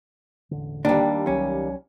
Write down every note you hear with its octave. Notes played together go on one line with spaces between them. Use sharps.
E1 A1 D3
D#2 G3 D4
C2 F#3 C#4